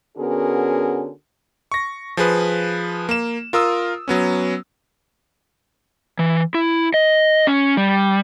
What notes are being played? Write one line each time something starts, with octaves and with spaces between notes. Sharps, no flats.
D3 B3 C#4 F#4 G#4 A#4
C#6 A#6
F3 G#4 B4
A#3 E7
F4 A#4 D#6 E6
F#3 B3 C#4
E3
E4
D#5
C#4
G3